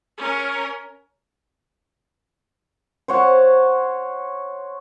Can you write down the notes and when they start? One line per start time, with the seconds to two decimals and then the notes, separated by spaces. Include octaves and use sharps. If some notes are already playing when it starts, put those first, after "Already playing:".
0.17 C#4 A#4
3.08 C5 C#5 F#5